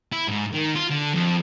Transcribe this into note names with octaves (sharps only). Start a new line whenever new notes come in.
E4
G#2
D#3
F4
D3
F2